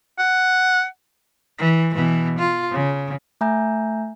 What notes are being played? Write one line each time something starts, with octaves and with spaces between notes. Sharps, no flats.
F#5
E3
B2 E3
F4
C#3
A3 E5 G#5 A#5 G6